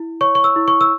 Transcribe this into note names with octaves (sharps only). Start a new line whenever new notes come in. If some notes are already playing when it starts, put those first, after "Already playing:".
Already playing: E4
C#5 C#6
C#6
E6
E4
C#6
E6